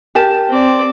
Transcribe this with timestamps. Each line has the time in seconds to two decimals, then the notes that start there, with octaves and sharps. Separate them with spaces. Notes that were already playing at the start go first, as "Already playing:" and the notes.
0.15 G4 A#4 A5
0.49 C4 D5